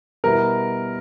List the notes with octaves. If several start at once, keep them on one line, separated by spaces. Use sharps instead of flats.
B2 G3 B3 E4 A#4